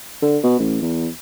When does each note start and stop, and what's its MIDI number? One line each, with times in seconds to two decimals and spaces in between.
0.22 0.38 50
0.43 0.58 47
0.59 0.78 33
0.81 1.09 40